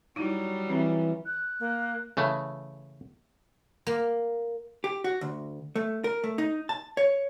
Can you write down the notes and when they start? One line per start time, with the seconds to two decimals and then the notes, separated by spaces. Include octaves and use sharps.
0.16 F#3 G3 D#4 E4
0.69 E3 C4
1.26 F#6
1.60 A#3
2.17 C#3 E3 A3
3.87 A#3
4.84 G4
5.04 F#4
5.21 D2
5.76 A3
6.04 A#4
6.24 A3
6.38 D#4
6.69 A5
6.97 C#5